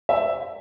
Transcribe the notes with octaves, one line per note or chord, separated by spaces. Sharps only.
E5